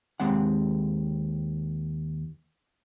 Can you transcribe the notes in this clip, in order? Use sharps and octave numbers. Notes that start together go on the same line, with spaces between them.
D#2 G#3 C4 F#5